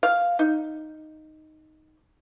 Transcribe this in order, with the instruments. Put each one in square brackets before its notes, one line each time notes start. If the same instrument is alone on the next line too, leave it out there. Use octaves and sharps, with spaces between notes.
[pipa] F5
D#4